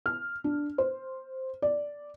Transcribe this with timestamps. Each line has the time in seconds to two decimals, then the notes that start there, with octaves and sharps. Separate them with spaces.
0.06 F6
0.44 D4
0.78 C5
1.62 D5